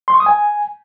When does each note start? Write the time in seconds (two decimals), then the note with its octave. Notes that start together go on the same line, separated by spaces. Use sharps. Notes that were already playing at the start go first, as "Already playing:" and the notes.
0.08 C6
0.14 C#6
0.20 D#6
0.26 G#5